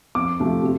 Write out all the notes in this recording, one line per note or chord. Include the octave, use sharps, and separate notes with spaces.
F2 D6
C3 F3 A3
C3